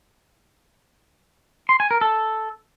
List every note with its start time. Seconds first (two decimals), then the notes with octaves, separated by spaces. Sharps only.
1.69 C6
1.80 G#5
1.91 A#4
2.01 A4